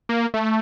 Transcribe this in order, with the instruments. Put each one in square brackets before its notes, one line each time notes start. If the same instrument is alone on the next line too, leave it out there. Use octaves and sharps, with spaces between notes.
[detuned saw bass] A#3
A3